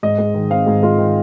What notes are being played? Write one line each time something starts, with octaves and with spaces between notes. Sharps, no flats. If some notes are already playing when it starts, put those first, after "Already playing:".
G#2 D#5
G#3
D#3
C4 F5
G#2 G#4
G#3 F4
D#3